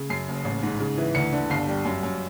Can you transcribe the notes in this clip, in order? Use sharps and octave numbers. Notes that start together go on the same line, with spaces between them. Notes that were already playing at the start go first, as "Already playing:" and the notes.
Already playing: C#3
F#2 C7
F#1
A1
G#2
C#3
E3
D2 C#7
D3
G1 C7
G3
F#2
F#2